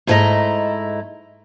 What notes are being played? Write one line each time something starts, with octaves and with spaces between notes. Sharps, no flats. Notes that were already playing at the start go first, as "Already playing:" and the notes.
G#2 A3 E4 C5 D#5 A#5